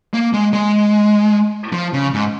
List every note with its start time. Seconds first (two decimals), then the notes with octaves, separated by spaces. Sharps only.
0.14 A#3
0.33 G#3
0.53 G#3
1.73 F3
1.93 C#3
2.13 G#2